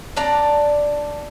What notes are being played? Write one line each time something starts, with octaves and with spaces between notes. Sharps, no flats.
D4 D5 A#5